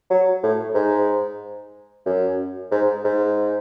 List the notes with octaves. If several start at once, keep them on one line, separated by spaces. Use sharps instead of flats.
F#3
A2
G#2
F#2
G#2
G#2